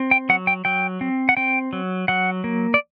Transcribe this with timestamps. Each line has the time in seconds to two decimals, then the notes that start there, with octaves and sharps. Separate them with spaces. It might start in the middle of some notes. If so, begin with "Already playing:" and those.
Already playing: C4
0.11 G5
0.29 F#3 F#5
0.47 G5
0.65 F#3 G5
1.01 C4
1.29 F#5
1.37 C4 G5
1.73 F#3
2.08 F#3 F#5
2.44 A#3
2.74 D5